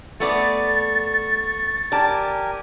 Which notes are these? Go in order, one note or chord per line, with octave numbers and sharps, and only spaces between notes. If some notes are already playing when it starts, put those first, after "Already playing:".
A3 B3 D5 C#6 A6
G4 A#4 D5 G#5 A5